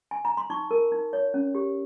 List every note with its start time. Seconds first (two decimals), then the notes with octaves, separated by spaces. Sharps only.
0.11 G#5
0.25 A#5
0.37 C6
0.50 D#4 C#6
0.71 A#4
0.92 D#4
1.13 C#5
1.34 C#4
1.55 G4